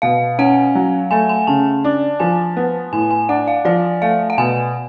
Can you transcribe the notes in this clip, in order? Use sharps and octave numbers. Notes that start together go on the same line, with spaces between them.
B2 F5
C#4 F#5
F#3
A3 G#5
G#5
C#3 A5
D4
F3 G#5
B3
A2 G#5
G#5
D4 F#5
F5
F3 D5
A3 F5
F#5
B2 G#5